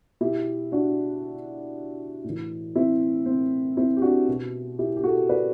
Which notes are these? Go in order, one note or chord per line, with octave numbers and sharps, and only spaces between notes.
B2 E4 G4
D4 F#4
A2 E3
C4 E4
C4
C4 E4
G4
D4 F#4
B2
E4 G4
G4
F#4 A4
B4 D5